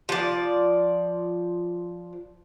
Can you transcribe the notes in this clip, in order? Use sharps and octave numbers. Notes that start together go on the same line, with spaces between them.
F3 D5